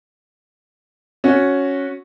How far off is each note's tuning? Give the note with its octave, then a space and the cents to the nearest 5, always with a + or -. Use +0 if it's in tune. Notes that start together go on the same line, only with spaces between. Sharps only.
C#4 +0 F#4 -10